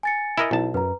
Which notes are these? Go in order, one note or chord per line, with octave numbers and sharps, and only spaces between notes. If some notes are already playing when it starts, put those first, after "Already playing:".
G#5 A6 C#7
E4 A#4 D#5
B1 E4 A5
F#2 B4 A#5